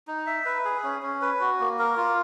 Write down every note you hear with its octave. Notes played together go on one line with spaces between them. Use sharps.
D#4
E5
B4
G#4
C#4
C#4
B4
F#4
A#3
A#4
F4